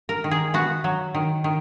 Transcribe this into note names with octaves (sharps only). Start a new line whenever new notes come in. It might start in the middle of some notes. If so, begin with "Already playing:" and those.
A#4
D#3
G#4
B3 F#4
F#3
D#3
D#3